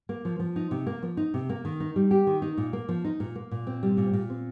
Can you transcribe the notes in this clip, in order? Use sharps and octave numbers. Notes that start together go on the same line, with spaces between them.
A#3
F3
F3
D#4
C3
A#3
F3
D#4
C3
A#3
D#3
D#4
G3
G4
D#3
D#4
A#2
A#3
F3
D#4
A#2
A#3
A#2
C4
G3
A#2
A#2
C4